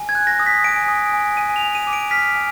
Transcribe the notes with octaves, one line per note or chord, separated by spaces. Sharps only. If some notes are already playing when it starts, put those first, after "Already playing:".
Already playing: G#5
G#6
F#6
A#6
D#6
B6
G#5 D7
D#6
G#5
G#5 D#7
F7
G#5
D#7
D6
D7
F6 B6
G#5